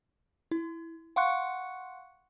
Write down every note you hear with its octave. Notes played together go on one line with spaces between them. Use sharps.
E4
F5 F#5 C6 C#6 F#6 C#7